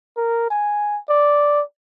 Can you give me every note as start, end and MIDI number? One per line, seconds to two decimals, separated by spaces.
0.17 0.50 70
0.50 0.98 80
1.09 1.62 74